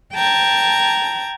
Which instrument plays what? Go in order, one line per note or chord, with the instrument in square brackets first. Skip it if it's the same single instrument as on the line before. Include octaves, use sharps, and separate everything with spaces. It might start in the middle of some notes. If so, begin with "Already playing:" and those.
[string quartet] G5 A5 A#5 G#6